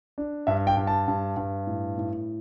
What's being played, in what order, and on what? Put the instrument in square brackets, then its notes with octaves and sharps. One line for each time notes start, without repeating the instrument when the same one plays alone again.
[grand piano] D4
G2 E5
G5
G2
A5
G2
G2
A2
A2